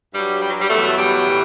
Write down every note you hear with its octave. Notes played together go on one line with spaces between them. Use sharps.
G2 F#3 G3
G3
F#3
G3
E2 B2 F#3 A3
G3
A2 E3